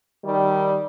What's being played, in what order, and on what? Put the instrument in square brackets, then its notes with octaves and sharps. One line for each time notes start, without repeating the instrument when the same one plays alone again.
[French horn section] D#3 G3